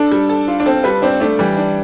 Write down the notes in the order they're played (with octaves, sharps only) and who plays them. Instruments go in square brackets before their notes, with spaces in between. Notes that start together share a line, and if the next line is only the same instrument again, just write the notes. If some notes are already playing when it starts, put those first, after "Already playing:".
Already playing: [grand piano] D4 [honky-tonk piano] A4
[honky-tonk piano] G3
A4
F4
[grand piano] D4
[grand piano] C4 [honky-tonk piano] A4
[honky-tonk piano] G3 [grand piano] B4
[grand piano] C4 [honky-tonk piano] D4
[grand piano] A3 [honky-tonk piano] D4
[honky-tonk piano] E3 [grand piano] G3
[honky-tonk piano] D4